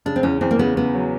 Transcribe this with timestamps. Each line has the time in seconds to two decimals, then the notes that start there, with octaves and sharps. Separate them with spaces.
0.06 C#3 D4
0.16 C4
0.23 E2 C#4
0.41 E2 C4
0.51 A#3
0.59 C#3 B3
0.76 C#3 B3
0.94 F#3